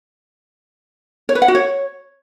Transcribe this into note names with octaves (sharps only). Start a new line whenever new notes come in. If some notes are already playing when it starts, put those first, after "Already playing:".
C#5
B4
F#5
F#4
C#5